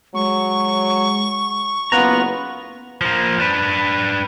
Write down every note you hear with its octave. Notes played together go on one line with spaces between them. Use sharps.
F#3 G#3 C#6
F#1 B3 F4 F#5 A#5
F3 A#3
D4 B4